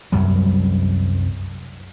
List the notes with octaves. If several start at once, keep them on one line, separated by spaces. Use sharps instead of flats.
C2 F#2 F#3 G3